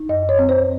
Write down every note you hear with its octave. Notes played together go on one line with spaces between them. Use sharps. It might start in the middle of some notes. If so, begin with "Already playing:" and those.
Already playing: D#4
F#2 D#5
C#5
C4
C5